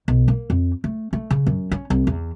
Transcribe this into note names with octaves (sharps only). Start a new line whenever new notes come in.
B1
A#3
F2
A3
A3
C#3
F#2
C#4
C2
E2